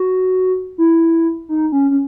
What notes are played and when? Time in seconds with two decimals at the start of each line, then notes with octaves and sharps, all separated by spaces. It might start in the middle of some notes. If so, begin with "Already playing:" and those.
Already playing: F#4
0.78 E4
1.49 D#4
1.72 C#4
1.91 C#4